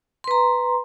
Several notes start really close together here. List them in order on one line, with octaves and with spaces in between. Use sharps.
C6 B4 A#5